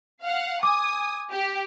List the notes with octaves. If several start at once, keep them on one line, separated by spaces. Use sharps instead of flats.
F5 F#5
G#5 D6 D#6
G4